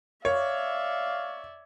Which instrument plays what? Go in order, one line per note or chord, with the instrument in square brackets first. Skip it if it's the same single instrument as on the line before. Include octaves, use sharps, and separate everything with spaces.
[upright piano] C#5 [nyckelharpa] D5 E5 [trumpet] F5